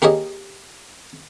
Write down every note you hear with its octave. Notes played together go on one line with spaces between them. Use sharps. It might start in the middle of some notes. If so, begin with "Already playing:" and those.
A#3 G4 G#4 C#5 D#5